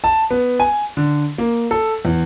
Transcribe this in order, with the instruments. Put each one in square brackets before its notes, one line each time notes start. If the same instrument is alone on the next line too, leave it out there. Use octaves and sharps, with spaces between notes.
[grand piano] A5
B3
G#5
D3
A#3
A4
E2